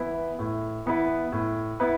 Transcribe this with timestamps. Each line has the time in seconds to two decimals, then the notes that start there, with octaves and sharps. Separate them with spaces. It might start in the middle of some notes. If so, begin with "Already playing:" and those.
Already playing: E3 B3 E4 B4
0.39 A2
0.86 E3 B3 E4 B4
1.32 A2
1.80 B3 E4 B4